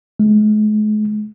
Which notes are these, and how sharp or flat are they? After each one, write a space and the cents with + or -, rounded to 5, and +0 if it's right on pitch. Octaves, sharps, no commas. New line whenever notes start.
G#3 +40